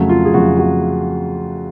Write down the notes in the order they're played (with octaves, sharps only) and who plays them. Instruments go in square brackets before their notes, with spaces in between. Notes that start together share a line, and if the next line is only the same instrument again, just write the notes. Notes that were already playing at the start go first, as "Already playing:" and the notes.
Already playing: [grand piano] F2 C#3 F#3 A3
F4
G#4
F2 C#3 F#3 A3 F#4
F#4